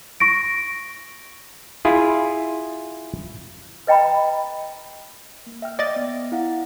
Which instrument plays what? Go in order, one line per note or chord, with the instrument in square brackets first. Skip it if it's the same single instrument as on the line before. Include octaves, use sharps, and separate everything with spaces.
[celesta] C#6 A#6 D7
[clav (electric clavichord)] E4 F4 G#4
[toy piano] B4 D#5 G5 A#5 B5
[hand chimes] A#3
E5 G5 F6
[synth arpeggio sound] D5 D#5 A6
[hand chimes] B3
E4 F5 F#5